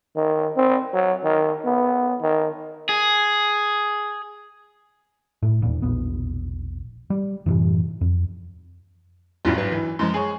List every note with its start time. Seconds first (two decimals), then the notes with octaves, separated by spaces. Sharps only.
0.16 D#3
0.56 C4
0.93 F#3
1.24 D#3
1.65 B3
2.21 D#3
2.89 G#4
5.43 A2 A3
5.62 E1 D#2 A#2
5.82 E1 A#1 B3
7.10 G3
7.46 F#2 A2 C3 E3
8.01 F2
9.45 G#1 E2 G2 F#3 C#4 F4
9.58 B4
9.72 E3
9.99 F#2 F3 G#3 C6
10.14 G#4 C#5